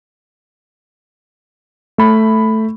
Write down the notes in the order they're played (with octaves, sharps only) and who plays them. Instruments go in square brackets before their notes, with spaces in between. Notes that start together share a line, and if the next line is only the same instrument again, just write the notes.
[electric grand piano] A3 B5